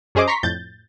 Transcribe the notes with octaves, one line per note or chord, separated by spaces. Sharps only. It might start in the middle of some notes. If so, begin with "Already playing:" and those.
F#2 C#4 G#4 C5 D#5 D6
A#5 C6 C#6 B6
F2 A2 G6 A6